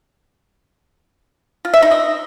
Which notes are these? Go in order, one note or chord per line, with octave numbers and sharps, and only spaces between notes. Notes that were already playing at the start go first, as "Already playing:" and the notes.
F4
E5
D#4
D#5